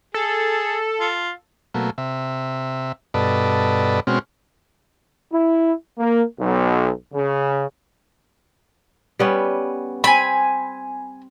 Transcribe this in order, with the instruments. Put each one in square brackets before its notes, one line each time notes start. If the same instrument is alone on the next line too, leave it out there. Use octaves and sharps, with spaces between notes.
[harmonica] G#4 [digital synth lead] A4
[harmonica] F4
[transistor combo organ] B2 F#3 A3 A#3
C3 E5
G2 B2 A4 B4 D5 D#5
B2 G#3 C4 C#4 F#4 F6
[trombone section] E4
A#3
B1
C#3
[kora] G3 B3 C#4
[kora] C4 [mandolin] G#5 B5